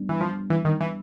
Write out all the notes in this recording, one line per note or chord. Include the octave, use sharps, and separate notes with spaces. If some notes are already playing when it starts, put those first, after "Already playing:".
Already playing: G3 B3 D4
E3
F3
E3
D#3
E3